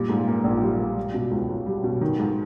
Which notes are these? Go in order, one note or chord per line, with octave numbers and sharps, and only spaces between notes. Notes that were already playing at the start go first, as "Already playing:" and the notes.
Already playing: A#2 G3
G#2
A#3
A#1
G3
G#2
G3
B2
C#2
C#2
G3
B2
D#3
G#2